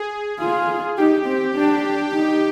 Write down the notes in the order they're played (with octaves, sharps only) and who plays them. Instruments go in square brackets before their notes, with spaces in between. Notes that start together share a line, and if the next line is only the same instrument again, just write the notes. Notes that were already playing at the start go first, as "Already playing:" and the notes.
Already playing: [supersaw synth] G#4
[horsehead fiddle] F4 [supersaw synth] G#4
[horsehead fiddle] D#4 [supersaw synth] G4
[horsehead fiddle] C4
D4
D#4